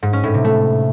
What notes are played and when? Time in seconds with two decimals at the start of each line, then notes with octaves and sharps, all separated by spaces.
0.03 G#2
0.13 C#4
0.23 A2
0.34 C3
0.44 A3